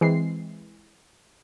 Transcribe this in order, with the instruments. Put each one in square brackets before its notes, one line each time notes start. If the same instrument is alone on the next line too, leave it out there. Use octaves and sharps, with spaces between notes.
[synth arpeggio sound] E3 G#3 C4 C7